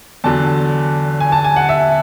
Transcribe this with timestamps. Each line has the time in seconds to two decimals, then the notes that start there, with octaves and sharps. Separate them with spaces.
0.24 E2 D3 F#3 A5
1.20 G#5
1.32 A5
1.44 G#5
1.56 F#5
1.69 E5